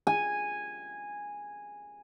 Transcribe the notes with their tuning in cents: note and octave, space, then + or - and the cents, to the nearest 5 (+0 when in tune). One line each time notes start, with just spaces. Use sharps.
G#5 -10